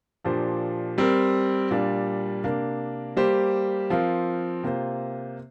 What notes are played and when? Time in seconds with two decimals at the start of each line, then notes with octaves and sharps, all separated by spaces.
0.24 A#2 F3 D4 G4 C5
0.98 G3 C4 A#4
1.71 A#2 G3 D4 F4
2.44 C3 A#3 D4 A#4
3.17 G3 A#3 G4 C5
3.90 F3 C4 F4 A#4
4.63 C3 A#3 F4 C5